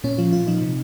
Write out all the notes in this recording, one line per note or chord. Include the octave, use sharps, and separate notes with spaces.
A#2 C#4
F3 F4
A#2 F4
F3 D#4
C3